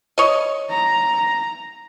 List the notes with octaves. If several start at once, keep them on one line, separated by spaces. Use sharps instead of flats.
C#5 D#5
A#5